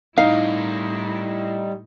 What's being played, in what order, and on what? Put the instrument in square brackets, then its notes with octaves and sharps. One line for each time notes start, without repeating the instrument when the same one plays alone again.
[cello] A2 E4 [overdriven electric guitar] G3 A#4 [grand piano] D#4 [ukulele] F5